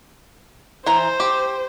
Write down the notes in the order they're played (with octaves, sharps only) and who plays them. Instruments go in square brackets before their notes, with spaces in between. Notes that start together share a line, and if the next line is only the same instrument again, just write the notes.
[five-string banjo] E3 A#5 [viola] C5
[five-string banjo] G4